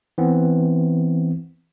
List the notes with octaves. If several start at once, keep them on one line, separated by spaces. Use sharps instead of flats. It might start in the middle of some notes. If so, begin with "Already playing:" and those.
E3 B3 C4